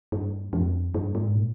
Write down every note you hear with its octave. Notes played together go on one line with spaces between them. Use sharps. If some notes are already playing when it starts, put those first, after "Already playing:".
G2
F2
G2
G#2
A#2